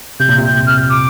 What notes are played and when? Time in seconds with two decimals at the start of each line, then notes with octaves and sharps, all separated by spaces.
0.19 C3 G6
0.29 A#2
0.38 C3 G6
0.66 F6
0.89 D6